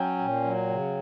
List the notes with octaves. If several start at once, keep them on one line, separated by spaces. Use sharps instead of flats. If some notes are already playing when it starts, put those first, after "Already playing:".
Already playing: F#3 C#4 G5
A#2
F#3
C#3